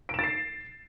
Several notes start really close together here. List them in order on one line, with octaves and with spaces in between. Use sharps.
D7 E7 A6 C7